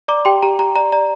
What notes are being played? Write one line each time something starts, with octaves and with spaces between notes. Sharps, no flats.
D5 A#5 D6
G4 G5 C6
G4 A#5
G4 A#5
D5 A#5
D5 A#5